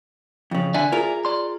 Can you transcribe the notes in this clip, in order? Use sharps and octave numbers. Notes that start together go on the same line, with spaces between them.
F2 C#3
D3 D5 E5 G#5
F4 G#4 A#4
D5 C6